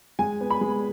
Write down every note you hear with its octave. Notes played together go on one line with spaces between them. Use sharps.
G#3 G#5
B3
B5
G#3